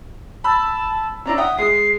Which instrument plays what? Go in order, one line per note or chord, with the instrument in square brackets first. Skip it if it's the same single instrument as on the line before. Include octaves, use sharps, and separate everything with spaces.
[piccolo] A5 [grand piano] B5 E6
[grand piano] C#4 D4 E4 [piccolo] A#5
[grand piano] E5 F#5 G5 [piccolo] D#6
[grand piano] G#3 D#6 [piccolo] C7